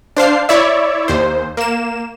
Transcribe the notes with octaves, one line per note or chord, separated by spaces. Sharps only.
D4 C5 F5 C7
E4 C#5 D5 E5
D#2 C5
A#3 E7